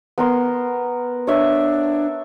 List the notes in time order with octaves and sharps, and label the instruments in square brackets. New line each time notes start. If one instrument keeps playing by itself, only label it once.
[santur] B3 A#4 C6
[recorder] D4 [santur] C#5 E5